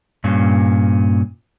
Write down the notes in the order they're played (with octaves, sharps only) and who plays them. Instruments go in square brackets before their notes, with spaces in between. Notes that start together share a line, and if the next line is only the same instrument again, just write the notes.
[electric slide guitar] G2 A#2 C#4